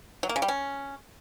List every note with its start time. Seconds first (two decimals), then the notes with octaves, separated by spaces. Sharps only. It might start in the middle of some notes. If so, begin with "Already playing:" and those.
0.23 F#3
0.29 A#3
0.36 C#3
0.42 G3
0.48 C#4